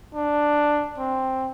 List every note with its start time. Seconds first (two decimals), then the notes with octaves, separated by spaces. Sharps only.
0.15 D4
0.98 C4